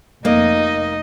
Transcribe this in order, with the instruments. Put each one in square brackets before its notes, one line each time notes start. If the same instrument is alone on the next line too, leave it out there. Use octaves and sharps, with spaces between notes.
[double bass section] F1 [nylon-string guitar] A#3 [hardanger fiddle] D#4 [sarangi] D#5